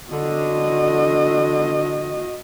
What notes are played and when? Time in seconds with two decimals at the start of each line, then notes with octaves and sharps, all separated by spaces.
0.12 D3 F#4 D#5